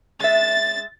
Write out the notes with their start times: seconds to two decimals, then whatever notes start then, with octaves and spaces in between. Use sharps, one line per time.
0.20 G#3 E5 A6